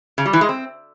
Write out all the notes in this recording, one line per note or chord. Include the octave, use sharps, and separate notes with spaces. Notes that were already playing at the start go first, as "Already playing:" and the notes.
C#3
G3
E3
G#3
C4